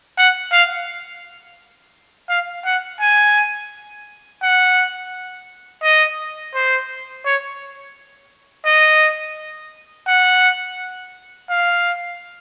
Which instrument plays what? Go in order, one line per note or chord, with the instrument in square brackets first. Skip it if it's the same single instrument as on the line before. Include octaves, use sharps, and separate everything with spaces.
[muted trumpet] F#5
F5
F5
F#5
G#5
F#5
D#5
C5
C#5
D#5
F#5
F5